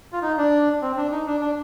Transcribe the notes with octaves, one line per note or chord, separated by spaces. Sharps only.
F4
D#4
D4
C4
D4
D#4
D4
D4